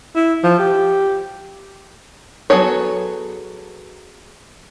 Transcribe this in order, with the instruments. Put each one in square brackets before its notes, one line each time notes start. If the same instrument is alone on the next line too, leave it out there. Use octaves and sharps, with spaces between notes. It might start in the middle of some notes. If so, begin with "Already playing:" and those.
[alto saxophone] E4
F3
G4
[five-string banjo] F#3 B3 G#4 A4 C#5